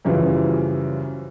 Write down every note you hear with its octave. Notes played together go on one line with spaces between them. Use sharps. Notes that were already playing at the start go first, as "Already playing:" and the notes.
F#2 C#3 E3 F3 G3